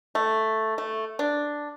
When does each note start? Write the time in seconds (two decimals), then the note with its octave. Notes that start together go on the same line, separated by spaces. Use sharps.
0.15 A3
0.78 A3
1.19 D4